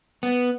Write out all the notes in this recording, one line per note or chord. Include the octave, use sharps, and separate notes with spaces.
B3